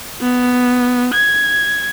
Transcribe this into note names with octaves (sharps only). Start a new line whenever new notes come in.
B3
G#6